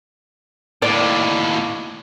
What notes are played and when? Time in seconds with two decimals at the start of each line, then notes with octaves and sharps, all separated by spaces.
0.82 D#2 A2 D5